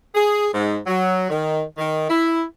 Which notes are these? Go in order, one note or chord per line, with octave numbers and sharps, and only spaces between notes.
G#4
G#2
F#3
D#3
D#3
E4